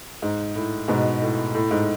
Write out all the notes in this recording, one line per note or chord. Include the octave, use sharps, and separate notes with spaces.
G#2
A2
G#2 B2
A2
A2
G#2